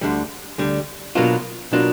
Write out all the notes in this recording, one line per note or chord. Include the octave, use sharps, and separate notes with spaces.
D2 D3 G3
D2 D3 G3
B2 F#3 A#3 D4 F4
B2 F#3 A#3 D4 F4